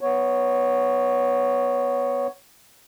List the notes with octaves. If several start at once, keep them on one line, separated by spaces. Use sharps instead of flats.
B3 C#5